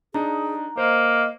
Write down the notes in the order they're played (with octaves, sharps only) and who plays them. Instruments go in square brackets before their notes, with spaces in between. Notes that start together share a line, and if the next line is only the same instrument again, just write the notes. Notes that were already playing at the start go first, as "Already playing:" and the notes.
[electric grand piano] D4 D#4 [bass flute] G#4 [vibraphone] A#5
[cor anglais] A#3 [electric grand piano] C5 [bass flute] D#5